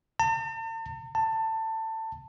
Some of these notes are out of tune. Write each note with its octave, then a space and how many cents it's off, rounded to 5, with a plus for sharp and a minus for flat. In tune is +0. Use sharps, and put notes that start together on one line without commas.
A5 +45
A5 +20